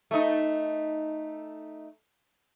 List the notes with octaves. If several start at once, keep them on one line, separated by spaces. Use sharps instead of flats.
A3 D#4